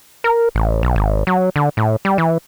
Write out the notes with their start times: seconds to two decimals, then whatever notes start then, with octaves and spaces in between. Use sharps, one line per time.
0.24 A#4
0.55 A1
0.83 B1
0.96 G#1
1.27 F#3
1.56 D3
1.77 A2
2.05 G3
2.18 E3